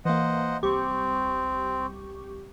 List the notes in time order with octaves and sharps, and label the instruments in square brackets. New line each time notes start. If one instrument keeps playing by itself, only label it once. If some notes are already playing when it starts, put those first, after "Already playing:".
[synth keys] E3 A#3 [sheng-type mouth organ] C5 D#5 F#5
[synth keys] C2 G4 C#6 [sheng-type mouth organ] C4